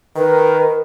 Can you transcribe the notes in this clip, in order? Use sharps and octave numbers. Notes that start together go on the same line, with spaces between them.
D#3 A#4 B4